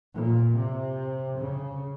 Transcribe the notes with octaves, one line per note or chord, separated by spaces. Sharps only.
A#2
C3
C#3